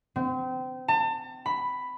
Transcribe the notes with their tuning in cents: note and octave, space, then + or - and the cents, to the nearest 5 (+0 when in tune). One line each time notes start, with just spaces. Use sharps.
C4 -30
A5 +35
B5 +5